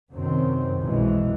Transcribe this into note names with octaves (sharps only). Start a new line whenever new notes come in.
F#2 C3 D#3 C4
B1 F#2 B2 E3 G#3